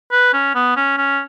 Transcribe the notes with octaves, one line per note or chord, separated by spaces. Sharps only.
B4
C#4
B3
C#4
C#4